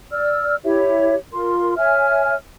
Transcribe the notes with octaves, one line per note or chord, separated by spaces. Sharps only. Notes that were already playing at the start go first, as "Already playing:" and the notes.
D5 E6 F6
E4 G4 C#5 E5
F4 A#4 C6
C#5 E5 G#5 F6